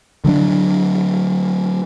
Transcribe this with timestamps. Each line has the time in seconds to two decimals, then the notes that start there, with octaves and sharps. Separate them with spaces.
0.24 D3 F#3 C4 D4